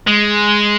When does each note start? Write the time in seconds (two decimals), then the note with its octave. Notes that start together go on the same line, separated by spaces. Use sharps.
0.07 G#3